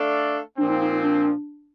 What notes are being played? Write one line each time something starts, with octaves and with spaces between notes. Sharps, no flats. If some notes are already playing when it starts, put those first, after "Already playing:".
Already playing: A3 D4 A4 D5 F5
A#2 F3 C4 D4
D#4
D#4
D#4
D4